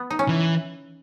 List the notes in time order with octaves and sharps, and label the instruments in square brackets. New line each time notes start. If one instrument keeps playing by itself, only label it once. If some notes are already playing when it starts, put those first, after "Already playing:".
Already playing: [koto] B3
D#4
C#4
[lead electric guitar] E3